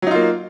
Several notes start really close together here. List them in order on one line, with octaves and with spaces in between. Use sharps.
F#3 D#4 F4 A#3